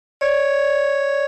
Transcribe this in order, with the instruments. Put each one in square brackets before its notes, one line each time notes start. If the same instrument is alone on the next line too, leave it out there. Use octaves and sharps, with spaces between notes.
[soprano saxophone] C#5 [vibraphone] D5